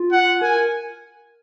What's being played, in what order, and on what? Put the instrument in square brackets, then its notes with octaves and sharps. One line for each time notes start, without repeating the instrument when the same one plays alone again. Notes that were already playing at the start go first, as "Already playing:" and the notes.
Already playing: [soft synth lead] F4
[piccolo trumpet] F#5
[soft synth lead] A#4 [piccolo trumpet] G#5